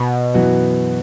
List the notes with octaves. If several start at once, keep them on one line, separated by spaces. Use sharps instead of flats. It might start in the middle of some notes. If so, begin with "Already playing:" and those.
Already playing: B2
F#2 E3 B3 F#4